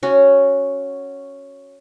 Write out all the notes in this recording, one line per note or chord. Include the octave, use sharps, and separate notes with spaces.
C#4 F#4